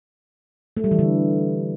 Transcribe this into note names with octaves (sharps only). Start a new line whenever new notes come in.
A3
G3
E3
D3